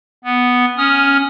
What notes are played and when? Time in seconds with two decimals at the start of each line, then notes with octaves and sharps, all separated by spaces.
0.24 B3
0.78 C#4 D#6 F6